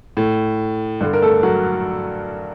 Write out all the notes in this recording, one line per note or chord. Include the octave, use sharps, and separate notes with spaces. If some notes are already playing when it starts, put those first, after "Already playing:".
A2
G2 D3
A#4
A3 A4
F#3 F#4